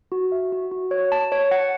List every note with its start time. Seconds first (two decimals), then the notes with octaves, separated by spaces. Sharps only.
0.12 F#4
0.32 E5
0.52 F#4
0.72 F#4
0.91 C#5
1.12 A5
1.32 C#5
1.51 F#5